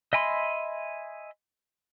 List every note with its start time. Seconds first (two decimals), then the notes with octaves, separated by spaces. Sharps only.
0.13 D#5 E5 G#5 B5 C6